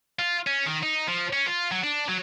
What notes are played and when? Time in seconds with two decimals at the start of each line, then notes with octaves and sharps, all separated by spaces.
0.19 F4
0.47 C#4
0.66 D#3
0.83 D#4
1.08 F3
1.33 C#4
1.46 F4
1.71 F#3
1.84 D4
2.09 F#3